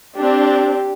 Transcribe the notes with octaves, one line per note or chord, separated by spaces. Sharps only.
C4 D4 G4